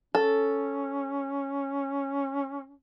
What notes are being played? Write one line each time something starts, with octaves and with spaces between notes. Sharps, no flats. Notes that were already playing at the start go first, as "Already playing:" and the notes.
C#4 A4